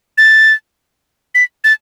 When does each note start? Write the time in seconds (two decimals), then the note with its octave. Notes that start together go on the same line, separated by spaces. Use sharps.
0.18 A6
1.35 B6
1.64 A6